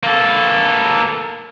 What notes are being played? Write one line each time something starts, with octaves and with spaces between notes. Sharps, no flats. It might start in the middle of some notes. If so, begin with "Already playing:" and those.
A#3 A4